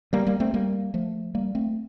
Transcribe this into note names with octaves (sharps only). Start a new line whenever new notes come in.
G3 A#3
G3 A#3
A3 C4
G3 A#3
F3 A3
G3 A#3
A3 C4